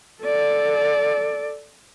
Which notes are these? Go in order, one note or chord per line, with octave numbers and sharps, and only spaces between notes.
A4 D5